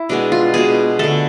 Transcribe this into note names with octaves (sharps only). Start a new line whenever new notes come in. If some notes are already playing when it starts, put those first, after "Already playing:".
Already playing: E4
B2 G#3 B3 D4
F4
B2 G#3 B3 G#4
D3 A3 A4